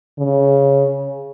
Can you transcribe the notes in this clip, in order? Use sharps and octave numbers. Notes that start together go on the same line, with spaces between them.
C#3